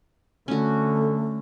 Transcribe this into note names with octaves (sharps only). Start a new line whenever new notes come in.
D3 A3 C#4 F#4 A4